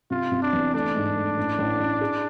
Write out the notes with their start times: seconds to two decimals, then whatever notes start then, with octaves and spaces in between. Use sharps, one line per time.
0.10 C3 F4
0.32 C3
0.43 D4
0.53 E2
0.74 A3 D4
0.95 G#2
1.16 A3
1.38 A1
1.59 A1
1.80 A1
2.01 G#4